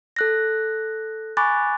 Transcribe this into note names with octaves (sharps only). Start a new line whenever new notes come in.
A4 F#6 A#6
G#5 B5 C#6 D6 F#6 A6